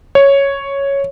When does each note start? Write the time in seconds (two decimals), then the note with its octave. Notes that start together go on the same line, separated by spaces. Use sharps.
0.15 C#5